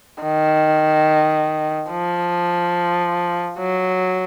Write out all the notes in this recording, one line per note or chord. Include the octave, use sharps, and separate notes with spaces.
D#3
F3
F#3